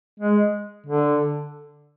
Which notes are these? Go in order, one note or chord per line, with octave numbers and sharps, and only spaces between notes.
G#3
D3